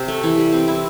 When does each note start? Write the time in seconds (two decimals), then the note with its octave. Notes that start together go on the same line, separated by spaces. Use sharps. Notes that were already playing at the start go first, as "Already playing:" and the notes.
Already playing: C3
0.08 A3
0.23 E3
0.38 G3
0.52 C4
0.68 E4